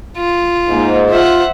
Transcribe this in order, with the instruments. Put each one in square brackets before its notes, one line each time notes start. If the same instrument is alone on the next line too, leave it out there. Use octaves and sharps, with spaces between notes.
[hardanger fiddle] F4
[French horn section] G#2 [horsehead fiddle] A#3
[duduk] F4 [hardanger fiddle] C5 F#5 [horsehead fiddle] E5